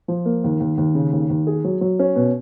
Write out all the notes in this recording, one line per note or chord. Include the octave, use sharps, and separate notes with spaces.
F3
A#3
D#2
D#2
D#2
C#3
D#2
D#2
G#4
F#3
F#3
C#4
B2